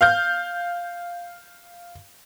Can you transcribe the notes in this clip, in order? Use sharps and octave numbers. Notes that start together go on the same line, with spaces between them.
F5 F6 G6